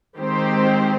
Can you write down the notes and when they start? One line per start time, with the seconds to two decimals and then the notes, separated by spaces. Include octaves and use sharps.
0.17 D#3 G#3 C4 G4 C5